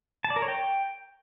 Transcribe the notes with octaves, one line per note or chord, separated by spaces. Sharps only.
A5
D5
A#4
C#5
G5